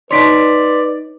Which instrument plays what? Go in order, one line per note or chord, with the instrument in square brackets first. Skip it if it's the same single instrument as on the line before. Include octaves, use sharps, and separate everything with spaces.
[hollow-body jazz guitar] D#4 C#5 [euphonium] B4 [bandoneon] D5 [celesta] C6 B6 D7